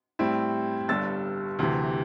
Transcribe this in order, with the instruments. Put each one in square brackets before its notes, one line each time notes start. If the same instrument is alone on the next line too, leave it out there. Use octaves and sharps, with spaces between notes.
[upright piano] A2 G3 C4 E4
G1 G2 G3 E6 A6
D2 C3 E3